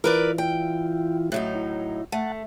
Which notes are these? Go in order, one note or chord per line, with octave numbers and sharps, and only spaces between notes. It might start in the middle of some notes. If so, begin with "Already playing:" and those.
E3 E4 F4 A#4 B4 D5
G5
A2 F#3 D#4
E4
A3 F#5 A5